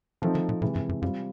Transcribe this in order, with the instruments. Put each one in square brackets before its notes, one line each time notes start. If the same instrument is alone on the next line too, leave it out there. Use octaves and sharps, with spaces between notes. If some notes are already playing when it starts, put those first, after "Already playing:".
[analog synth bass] E3 [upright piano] F3 A3 C4 D#4
[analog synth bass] D#3
A#2
[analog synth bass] A2 [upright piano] C3 E3 G#3
[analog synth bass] G2
F#2
[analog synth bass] F#2 [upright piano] G3 C4 F4